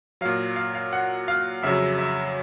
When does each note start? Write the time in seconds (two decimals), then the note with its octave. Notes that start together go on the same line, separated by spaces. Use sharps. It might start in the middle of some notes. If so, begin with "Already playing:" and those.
0.21 A#2 F#3 F5
0.56 F5
0.75 F5
0.93 F#5
1.28 F5
1.62 F2 C#3 F#3 E5
1.98 E5